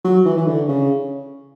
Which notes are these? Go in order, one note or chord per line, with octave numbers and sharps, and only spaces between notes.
F#3
E3
E3
D3
C#3